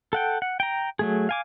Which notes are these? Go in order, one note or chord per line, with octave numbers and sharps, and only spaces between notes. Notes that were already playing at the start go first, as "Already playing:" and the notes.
A4 F#5 G5
F#5
G5 A#5
F#3 A3 G#4
F5 G#5 D6